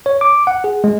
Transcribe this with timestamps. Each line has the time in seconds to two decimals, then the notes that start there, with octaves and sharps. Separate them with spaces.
0.06 C#5
0.21 D6
0.47 F#5
0.64 G#4
0.84 G#3